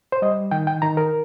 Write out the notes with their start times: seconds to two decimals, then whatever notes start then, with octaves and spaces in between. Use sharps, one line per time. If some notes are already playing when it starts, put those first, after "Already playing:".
0.12 C5
0.22 G3 D#5
0.51 D#3 G5
0.67 G5
0.82 D#3 A#5
0.97 A#4